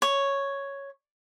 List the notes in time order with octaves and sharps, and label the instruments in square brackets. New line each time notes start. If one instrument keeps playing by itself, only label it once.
[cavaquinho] C#5